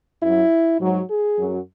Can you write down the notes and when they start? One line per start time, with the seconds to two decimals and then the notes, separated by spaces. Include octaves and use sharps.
0.21 F#2 F#3 E4
0.80 G#2 F#3
1.09 G#4
1.37 F#2 F#3